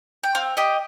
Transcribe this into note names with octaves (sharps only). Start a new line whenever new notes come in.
G5
C4 F5
G4 D#5